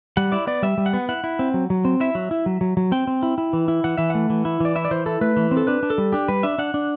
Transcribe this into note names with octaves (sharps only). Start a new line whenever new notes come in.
G3 F#5
E4 D5
B3 D5
G3 E5
G3
F#5
B3
E4 F#5
E4
C4
F#3
F#3
C4
E4 E5
F#3
E4
F#3
F#3
F#3
C4 G5
C4
E4
E4
E3
E4
E3 F#5
E3 E5
A3 F#5
E3
E4
E3 D5
E4 E5
D5
E3 C5
E4 A4
A3 B4
E3
C4
A4
D4 B4
D4
A4
G3
D4 G4
G3 B4
D4 E5
D4 F#5
D4